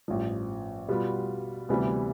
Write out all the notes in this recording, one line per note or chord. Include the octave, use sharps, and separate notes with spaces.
A1 G2 F3
B2 G3 B3 F4
D2 C3 E3 G3 B3